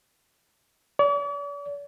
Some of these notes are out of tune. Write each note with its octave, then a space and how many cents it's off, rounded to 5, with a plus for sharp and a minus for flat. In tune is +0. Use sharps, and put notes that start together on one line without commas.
D5 -45